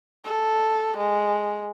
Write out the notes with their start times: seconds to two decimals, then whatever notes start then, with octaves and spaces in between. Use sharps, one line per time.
0.25 A4
0.98 G#3